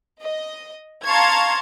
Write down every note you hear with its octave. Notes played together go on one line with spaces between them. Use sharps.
D#5
F5 A5 A#5 C6 C#6 G#6